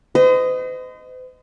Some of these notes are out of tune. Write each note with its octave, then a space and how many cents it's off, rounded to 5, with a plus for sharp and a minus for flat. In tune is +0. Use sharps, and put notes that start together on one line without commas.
C5 -45 D#5 +0